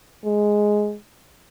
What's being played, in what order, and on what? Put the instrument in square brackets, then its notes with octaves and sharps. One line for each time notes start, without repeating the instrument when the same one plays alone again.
[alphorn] G#3